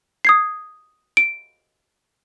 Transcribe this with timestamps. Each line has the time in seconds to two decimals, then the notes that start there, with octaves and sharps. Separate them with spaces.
0.25 D#6 G#6 C7
1.17 D7